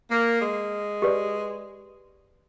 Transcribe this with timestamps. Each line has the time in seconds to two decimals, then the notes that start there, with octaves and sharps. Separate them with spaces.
0.10 A#3
0.40 G#3
1.02 G4 B4 D5